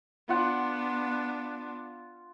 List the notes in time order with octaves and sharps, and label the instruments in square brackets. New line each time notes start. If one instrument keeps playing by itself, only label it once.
[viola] B3 D4 [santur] F4 F#5